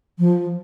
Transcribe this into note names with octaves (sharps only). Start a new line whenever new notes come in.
F3